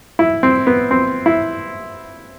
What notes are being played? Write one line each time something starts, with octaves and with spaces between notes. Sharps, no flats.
E4
C4
B3
C4
E4